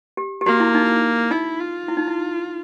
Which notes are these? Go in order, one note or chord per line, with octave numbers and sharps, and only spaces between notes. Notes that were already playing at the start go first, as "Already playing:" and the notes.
G4
G4
A#3 F#4
E4
D#4
D#4 E4
F4
E4
D#4
E4